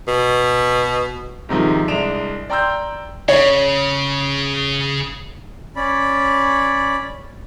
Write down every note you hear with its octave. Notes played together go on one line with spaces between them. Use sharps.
B2
G#2 C3 D#3 F3
C2 G#3 D4 D7 E7 F7
D5 G5 A#5 C6 E6 G6
C#3 C#5
C#4 D5 B5